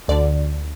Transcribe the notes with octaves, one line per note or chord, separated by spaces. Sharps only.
D2 D3 D5